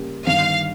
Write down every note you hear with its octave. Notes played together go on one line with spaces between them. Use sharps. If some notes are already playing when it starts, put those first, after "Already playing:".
Already playing: C#3 G3 A#3 C#4 G4
G1 G2 D#3 F5